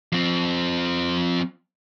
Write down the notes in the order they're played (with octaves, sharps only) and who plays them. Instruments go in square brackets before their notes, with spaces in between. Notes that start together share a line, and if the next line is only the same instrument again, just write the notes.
[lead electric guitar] F3 C4